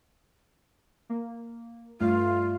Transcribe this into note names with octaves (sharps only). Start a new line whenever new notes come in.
A#3
G2 A3 F4 F5